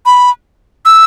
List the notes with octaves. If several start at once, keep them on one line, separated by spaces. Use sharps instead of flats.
B5
E6